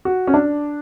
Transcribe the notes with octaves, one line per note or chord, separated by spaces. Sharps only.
F#4
C#4
D4